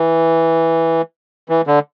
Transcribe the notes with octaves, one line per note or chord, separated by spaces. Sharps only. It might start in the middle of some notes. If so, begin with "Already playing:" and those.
Already playing: E3
E3
D3